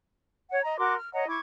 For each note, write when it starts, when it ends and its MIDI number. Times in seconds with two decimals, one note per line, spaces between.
0.50 0.61 73
0.50 0.61 78
0.63 0.77 75
0.63 0.77 82
0.78 0.95 66
0.78 0.95 70
0.78 0.95 84
0.78 0.95 86
0.96 1.11 89
1.13 1.27 73
1.13 1.27 75
1.13 1.27 78
1.13 1.27 82
1.28 1.40 64
1.28 1.40 85
1.28 1.40 86
1.28 1.40 92